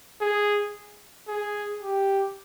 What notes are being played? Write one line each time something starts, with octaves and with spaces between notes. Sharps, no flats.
G#4
G#4
G4